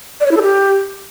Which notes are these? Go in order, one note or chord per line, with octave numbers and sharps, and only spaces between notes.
D5
C#5
E4
A4
G4